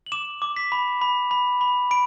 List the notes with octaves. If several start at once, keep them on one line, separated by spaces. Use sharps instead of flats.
F#7
D6 E7
D6
B6
B5
B5
B5
B5
B5 D7